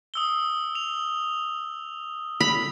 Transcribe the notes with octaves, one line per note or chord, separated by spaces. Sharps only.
D#6 E6 G7
F7
B5 F7